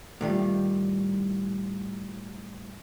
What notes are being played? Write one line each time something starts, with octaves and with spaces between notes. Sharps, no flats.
A2 D#3 G3 F4